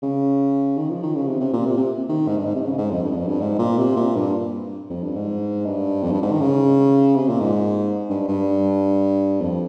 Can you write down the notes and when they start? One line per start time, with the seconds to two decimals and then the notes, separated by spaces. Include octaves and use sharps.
0.02 C#3
0.77 D#3
0.90 F3
1.02 D#3
1.15 C#3
1.27 C3
1.40 C3
1.53 A#2
1.65 C3
1.77 C3
2.09 D#3
2.28 G#2
2.37 G2
2.46 G#2
2.55 C3
2.65 C#3
2.78 G#2
2.90 F2
3.03 G2
3.15 F2
3.28 G2
3.40 G#2
3.59 A#2
3.77 C3
3.96 A#2
4.15 G2
4.90 F2
5.03 G2
5.15 G#2
5.65 G2
6.03 F2
6.12 G2
6.22 G#2
6.31 D#3
6.40 C#3
7.15 C3
7.28 A#2
7.40 G#2
8.09 G2
8.28 G2
9.41 F2